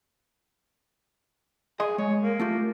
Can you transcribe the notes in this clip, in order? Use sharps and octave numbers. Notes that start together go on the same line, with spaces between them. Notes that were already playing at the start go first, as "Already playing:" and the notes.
G#4 D#5 C6
G#3 C#5
A#3
A3 F4 G4